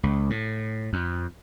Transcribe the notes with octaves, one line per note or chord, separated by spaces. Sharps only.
C#2
A2
F2